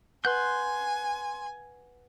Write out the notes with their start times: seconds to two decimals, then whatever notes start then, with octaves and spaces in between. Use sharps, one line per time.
0.25 B4 F#5 G#5 C6 F#6 G6